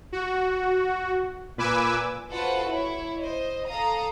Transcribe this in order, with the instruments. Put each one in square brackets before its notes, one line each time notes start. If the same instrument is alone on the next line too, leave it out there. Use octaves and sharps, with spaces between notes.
[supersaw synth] F#4
A#2 B4 G#5 D6 E6
[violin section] F4 F#4 A4 B4 C5 F#5
E4 C#5
C5 D#5
A4 F5 A#5 D#6